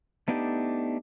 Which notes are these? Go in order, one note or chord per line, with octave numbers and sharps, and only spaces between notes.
A3 B3 D4 D#4 F#4 G4